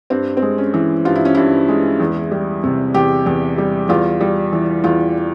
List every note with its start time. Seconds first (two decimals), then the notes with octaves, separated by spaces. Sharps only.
0.10 G2 C4
0.37 C4
0.42 G#3
0.58 C#4
0.74 E3
1.05 G2 F4
1.15 E4
1.25 C#4
1.35 G2 E4
1.69 G#3
2.00 E2
2.31 G3
2.64 C3
2.94 E2 G4
3.26 E2
3.58 G3
3.89 E2 F4
4.21 G3
4.53 E3
4.84 E2 F4